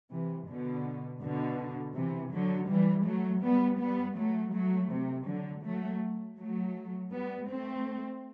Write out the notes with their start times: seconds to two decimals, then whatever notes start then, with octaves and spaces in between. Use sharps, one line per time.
0.11 C3 E3
0.47 B2 D3
1.21 B2 D3
1.95 C3 E3
2.32 D3 F#3
2.69 E3 G3
3.06 F#3 A3
3.42 G3 B3
3.79 G3 B3
4.16 F#3 A3
4.53 F#3 A3
4.90 C3
5.27 D3 F#3
5.64 F#3 A3
6.37 F#3 A3
7.11 G3 B3
7.48 A3 C4